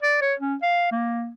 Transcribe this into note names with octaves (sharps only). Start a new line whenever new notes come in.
D5
C#5
C#4
F5
A#3